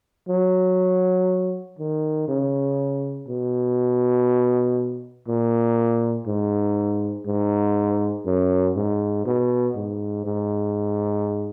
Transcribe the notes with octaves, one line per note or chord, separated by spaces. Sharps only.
F#3
D#3
C#3
B2
A#2
G#2
G#2
F#2
G#2
B2
G#2
G#2